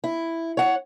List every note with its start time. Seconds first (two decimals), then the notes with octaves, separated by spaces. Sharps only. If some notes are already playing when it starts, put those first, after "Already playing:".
0.04 E4
0.57 C#5 F#5